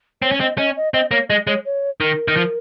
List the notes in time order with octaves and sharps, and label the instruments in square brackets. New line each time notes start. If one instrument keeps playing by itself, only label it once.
[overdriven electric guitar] C4 [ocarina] C#5
[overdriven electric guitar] C#4
[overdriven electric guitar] C4 [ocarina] D#5
[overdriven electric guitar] C#4 [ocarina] D#5
[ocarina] D#5
[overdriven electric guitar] C4 [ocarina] D#5
[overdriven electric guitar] A#3 [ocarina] C#5
[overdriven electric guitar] G#3 [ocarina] D#5
[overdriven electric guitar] G#3 [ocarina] C#5
[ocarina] C#5
[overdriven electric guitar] D#3 [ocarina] A#4
[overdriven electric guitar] D#3
F3